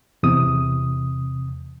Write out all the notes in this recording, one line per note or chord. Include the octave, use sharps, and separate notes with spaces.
E2 C3 D#6